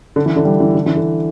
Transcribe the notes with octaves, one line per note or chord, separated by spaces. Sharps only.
D3
E3
D3
G3
E3
D3
E3
D3